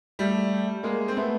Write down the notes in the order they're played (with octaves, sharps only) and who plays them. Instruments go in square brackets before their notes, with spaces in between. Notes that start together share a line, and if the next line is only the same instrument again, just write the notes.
[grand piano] G3 A3
G#3 A#3
C4
A3 B3